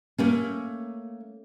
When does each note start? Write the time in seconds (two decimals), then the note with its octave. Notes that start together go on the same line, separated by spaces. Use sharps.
0.18 A3 A#3 C#4